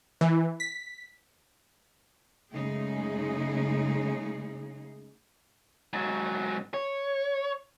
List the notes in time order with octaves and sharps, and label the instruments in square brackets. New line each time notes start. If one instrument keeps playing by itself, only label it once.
[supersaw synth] E3
B6
[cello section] F#2 C#3 G#3 A3 D#4 G#4
[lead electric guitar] G#2 F#3
C#5